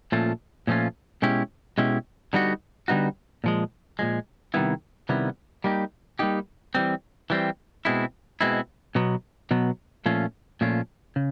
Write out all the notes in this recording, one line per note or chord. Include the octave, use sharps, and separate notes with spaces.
A#2 F3 A3 C#4 F4
A#2 F3 A3 C#4 F4
B2 G#3 C#4 E4 G4
B2 G#3 C#4 E4 G4
D3 G3 B3 D#4 F#4
D3 G3 B3 D#4 F#4
A#2 F3 G#3
A#2 F3 G#3
C3 D#3 G3 B3 E4
C3 D#3 G3 B3 E4
G3 A#3 D#4 G4
G3 A#3 D#4 G4
E3 G3 C4
E3 G3 C4
B2 G#3 C4 E4
B2 G#3 C4 E4
B2 F#3 B3
B2 F#3 B3
A#2 F3 A3 C#4 F4
A#2 F3 A3 C#4 F4
C#3